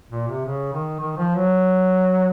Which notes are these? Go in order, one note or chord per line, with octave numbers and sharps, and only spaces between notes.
A#2
C3
C#3
D#3
D#3
F3
F#3